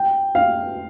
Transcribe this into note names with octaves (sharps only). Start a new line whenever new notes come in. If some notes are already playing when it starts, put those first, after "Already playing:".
Already playing: G5
F5